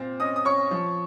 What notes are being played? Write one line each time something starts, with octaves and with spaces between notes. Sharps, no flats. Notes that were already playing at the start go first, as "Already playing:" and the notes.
Already playing: A#2 C4
C#4 D#5 D#6
D#6
C#4 C#5 C#6
F3